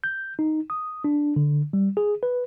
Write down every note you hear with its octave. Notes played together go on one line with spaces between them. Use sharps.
G6
D#4
D#6
D4
D3
G3
G#4
B4